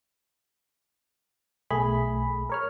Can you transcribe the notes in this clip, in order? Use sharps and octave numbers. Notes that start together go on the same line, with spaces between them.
B1 A3 G#4 B5
A#4 C#5 F6